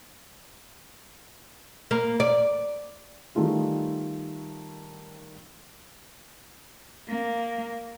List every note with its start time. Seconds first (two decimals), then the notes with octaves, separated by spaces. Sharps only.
1.91 A#3
2.20 D5
3.35 D#3 G3 A3 F4 G#4
7.09 A#3